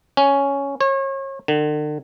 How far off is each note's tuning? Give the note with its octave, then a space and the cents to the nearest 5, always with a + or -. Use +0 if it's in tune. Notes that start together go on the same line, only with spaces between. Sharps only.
C#4 +5
C#5 -35
D3 +40